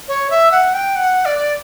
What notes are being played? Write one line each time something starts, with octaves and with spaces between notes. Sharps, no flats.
C#5
E5
F#5
G5
F#5
D5